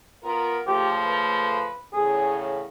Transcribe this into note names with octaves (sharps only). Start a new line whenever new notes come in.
B3 F4 A#4
C#3 F3 A3 G4
B4
E2 A2 C#3 G#4